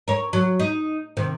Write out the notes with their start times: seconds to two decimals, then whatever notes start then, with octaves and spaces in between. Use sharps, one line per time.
0.08 A#4 C#5
0.33 F#3
0.59 D#4
1.17 C3 D#3